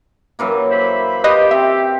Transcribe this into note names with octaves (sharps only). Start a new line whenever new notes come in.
F#2 E3 A#3
C5 E5 B5
G4 B4 C5 D#5
C4 E5